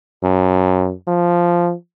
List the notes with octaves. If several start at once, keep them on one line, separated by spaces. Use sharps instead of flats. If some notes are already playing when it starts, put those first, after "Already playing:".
F#2
F3